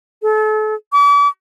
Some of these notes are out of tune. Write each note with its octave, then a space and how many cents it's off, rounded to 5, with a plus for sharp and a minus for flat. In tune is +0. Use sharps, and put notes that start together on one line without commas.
A4 -35
D6 -40